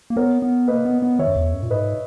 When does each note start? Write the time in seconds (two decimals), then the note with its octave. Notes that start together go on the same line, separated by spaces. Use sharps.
0.10 A#3
0.16 B3 A#4 C#5
0.42 B3
0.68 A#3 B4 D#5
0.85 B3
1.02 B3
1.19 D#3 C#5 E5
1.28 F#2
1.36 E2
1.53 F#2
1.63 A#2
1.71 G#2 B4 D#5